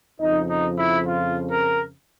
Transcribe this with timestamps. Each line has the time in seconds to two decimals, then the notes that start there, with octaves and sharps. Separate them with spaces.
0.20 F2 C#3 F3 D#4
0.49 D#4
0.78 E4
1.07 F4
1.50 A#4